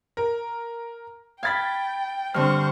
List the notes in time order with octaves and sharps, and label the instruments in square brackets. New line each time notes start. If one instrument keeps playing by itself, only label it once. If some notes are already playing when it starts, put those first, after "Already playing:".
[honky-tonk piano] A#4
[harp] F5 B5 [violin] G5 [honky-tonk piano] G#6 A6 B6
[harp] G2 D3 C4 [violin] C5 C#6 [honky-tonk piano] F6